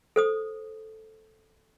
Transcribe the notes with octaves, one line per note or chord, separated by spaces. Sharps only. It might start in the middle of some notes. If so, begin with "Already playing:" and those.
A4 C5 D#6